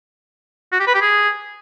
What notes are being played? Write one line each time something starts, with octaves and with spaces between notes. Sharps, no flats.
F#4
G4
B4
G4
G#4